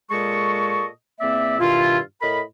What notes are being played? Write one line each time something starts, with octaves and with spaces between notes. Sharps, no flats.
A#2 G#3 G#4 A4 D#5 C#6
E2 A#3 C4 D5 E5
G2 B2 D#3 E4 F4
A2 A#4 D#5 B5